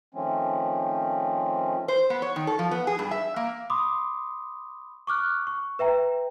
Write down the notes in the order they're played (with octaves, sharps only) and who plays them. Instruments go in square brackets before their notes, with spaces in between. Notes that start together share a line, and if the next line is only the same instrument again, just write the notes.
[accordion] D#3 F3 A3 C4 C#4
[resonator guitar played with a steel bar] C5
B3
C#5
D#3
A4
F3
B3
G#4
G2
E5
A#3
[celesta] B5 C6 D6 D#6
C#6 D6 F6 F#6
C#6
B4 E5 G5 A#5